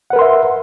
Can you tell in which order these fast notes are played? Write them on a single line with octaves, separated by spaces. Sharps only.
F#5 B4 A#4 C6 E5